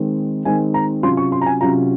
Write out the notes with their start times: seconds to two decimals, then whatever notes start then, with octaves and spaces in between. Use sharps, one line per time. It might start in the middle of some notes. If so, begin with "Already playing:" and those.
Already playing: D#3 G#3 C4 D#4
0.45 D#3 G#3 C4 D#4 G#5
0.74 A#5
1.03 C3 F#3 C#4 F4 C6
1.17 C#6
1.32 C6
1.41 A#5
1.46 G#5
1.61 C3 F#3 C#4 F4 A#5